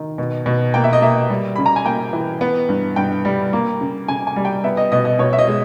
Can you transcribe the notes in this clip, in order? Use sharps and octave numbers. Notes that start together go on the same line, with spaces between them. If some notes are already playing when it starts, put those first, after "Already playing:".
Already playing: D#3
B2
B2
A#3 G5
E5
D#5
A#3 E5
G3
C#3 B5
A#5
G#5
A#3 G5
E3
B3
G2
G2 G5
G3
A#3
C#3
C#3 G#5
G#5
G3
G5
B3 E5
D#5
B2 D#5
D#5
B2 C#5
E5
D#5
G#3